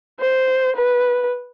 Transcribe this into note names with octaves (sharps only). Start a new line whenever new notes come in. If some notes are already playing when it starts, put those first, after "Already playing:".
C5
B4